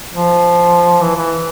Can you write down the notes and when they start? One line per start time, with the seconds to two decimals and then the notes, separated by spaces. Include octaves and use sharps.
0.14 F3
1.01 E3
1.16 E3